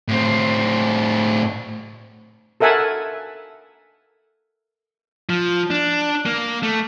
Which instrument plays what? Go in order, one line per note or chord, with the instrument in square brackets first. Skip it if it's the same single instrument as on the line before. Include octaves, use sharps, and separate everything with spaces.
[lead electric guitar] A2 C4
[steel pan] A4 A#4 E5 F#5 G#5 A5
[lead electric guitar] F3
D4
A#3
A3